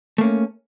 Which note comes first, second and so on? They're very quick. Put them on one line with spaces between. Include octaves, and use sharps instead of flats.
A3 A#3 C#4